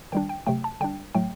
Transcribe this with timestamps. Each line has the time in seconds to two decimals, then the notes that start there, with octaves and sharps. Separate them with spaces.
0.12 D#3 G3 D4 G5
0.29 G5
0.47 C3 F#3 A3 G5
0.64 A5
0.81 D3 G3 D4 G5
1.15 A2 F#3 A3 G5